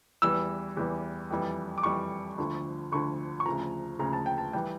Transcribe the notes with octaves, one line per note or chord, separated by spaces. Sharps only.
E2 E3 G3 E6
E2 E3 G3
F2 E3 G3
D6
F2 E3 G3 C#6
D2 D3 F3
D2 D3 F3 C#6
C#6
D2 C#3 F3 A#5
D2 C#3 F3 A#5
A5
G5
A5
E3 G3 G5